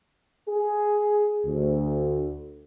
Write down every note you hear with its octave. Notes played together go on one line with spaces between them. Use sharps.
G#4
D2